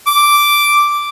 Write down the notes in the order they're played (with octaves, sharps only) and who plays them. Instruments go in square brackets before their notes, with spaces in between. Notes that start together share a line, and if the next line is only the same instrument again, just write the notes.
[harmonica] D6